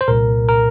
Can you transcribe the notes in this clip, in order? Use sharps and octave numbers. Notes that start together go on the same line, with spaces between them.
C5
C2 A#2 A#4
A#4